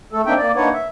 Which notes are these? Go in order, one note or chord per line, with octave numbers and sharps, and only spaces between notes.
A3 A4
A#3 C4 D4 D#4 E5 G5
A#3 D5
A#3 D4 D#4 B4 C#5 F#5
E5